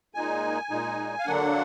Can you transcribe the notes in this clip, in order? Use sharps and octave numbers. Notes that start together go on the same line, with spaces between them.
A#2 G#3 D#4 G#5
A#2 G#3 D#4
F5
D3 F#3 A#3 D4 F#5